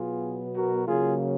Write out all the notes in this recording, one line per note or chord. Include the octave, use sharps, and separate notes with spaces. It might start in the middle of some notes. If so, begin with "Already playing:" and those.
Already playing: B2 F#3 B3 F4 G#4
F#4 A#4
C#3 F#3 A#3 F4 G#4